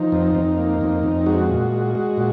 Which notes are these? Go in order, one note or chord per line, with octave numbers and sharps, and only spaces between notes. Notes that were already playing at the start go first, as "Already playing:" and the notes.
Already playing: F3 D#4
F2
F2
A#3
F2
F2
G#3 F#4
A#2
G#3
G#3
A#2